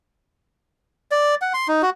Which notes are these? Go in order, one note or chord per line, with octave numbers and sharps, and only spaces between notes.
D5
F#5
C6
D#4
F#4